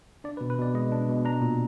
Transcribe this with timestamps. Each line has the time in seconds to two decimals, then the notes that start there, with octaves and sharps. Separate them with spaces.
0.24 D4 D5
0.37 B4
0.41 B2
0.50 B4
0.58 B2 D5
0.74 G#3 D#5
0.92 D4
1.09 B2
1.25 D4 A#5
1.41 A#2